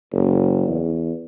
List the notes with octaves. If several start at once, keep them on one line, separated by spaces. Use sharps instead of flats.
F#1
E2